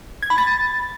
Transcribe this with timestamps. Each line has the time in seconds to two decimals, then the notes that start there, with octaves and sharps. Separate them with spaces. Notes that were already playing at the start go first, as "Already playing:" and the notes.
0.23 G#6
0.30 B5
0.38 A6